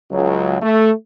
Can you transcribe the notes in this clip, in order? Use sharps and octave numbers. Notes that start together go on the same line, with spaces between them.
C#2 F#3
A3